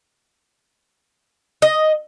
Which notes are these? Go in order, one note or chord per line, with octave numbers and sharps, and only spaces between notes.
D#5